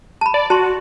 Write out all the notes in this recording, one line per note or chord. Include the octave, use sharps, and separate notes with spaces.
A5 B5
D5
F#4 A5 C6